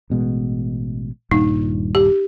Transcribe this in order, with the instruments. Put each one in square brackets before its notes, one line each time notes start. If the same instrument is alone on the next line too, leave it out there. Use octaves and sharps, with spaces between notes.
[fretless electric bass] A1 B2 G#3
[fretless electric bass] D#1 G2 A#2 [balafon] D#4
[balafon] G4